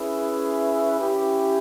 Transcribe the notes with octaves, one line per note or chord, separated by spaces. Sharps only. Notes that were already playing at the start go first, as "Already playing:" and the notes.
Already playing: C#4 E4 G#4 B4 E5
C#4 E4 G4